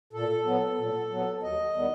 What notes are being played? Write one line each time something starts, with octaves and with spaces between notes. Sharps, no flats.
A#2 A4
F#3 B3
A#2
F#3 B3
D#2 D#5
D#3 G3 B3